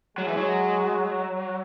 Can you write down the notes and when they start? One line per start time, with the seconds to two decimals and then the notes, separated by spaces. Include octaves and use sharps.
0.17 F#3 G#3
0.28 E3
0.37 F#3